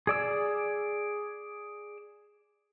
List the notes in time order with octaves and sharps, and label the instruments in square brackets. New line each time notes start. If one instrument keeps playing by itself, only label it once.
[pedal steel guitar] G#4 D5 E6